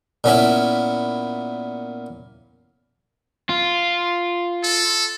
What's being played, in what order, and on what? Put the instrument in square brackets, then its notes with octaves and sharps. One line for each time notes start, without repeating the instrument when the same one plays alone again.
[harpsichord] A#2 B3 C#4 E4
[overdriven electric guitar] F4
[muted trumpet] A4